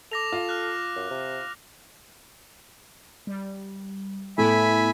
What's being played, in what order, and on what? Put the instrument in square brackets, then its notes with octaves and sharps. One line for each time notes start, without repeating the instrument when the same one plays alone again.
[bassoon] A4 [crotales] D6 A#6 F7
[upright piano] F4
[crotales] F6 F#6
[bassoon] F#2
C3
[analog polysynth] G3
[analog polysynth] A2 B3 E4 [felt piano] A3 [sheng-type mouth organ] E5 G#5 B5